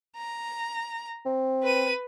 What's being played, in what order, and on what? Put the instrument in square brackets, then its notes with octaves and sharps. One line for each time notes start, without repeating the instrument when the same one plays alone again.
[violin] A#5
[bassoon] C4
[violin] B4 D#7